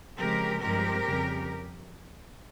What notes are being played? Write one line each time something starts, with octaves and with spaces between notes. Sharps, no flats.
C#3 F3 G#3 C4 G4 A#4
G2 F3 G#3 C4 G4 A#4
F2 C#3 G3